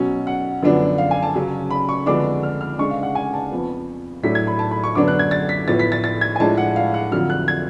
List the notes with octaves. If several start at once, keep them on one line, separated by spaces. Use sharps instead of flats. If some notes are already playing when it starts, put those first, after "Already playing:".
Already playing: B2 F#3 C#4
F#5
F#2 D3 F3 B3 D4
F5
G#5
A5
C#3 F#3 C#4
B5
C#6
F2 D3 G#3 B3 D4 D6
F6
F6
C#3 G#3 D4 C#6
F5
F#5
G#5
A5
F2 F3 B3
A2 F#3 A3 D4 B6
G#6
B5
A5
B5
C#6
F#2 D3 F#3 B3 D4 D6
F#6
G#6
A6
B6
A2 F3 B3 A6
B6
A6
A6
G#6
G#5
A2 F3 G#3 D4 A5
F#5
F5
F#5
F2 D3 F#3 F6
F#6
G#6